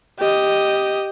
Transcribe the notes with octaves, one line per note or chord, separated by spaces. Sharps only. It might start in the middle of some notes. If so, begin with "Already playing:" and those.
G4 D#5